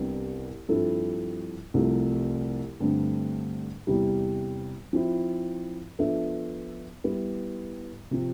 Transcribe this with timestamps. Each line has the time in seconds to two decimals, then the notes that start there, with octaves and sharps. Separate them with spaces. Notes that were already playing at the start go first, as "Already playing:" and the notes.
Already playing: C2 C3 G3 B3 D4
0.68 G2 F3 C4 E4 A4
1.74 C2 C3 F3 A3
2.80 G2 D3 A3 C4
3.87 E2 C3 E3 G3
4.93 F3 C4 E4
5.99 F3 B3 D4 A4 E5
7.04 G3 B3 E4
8.11 C3 F3 C4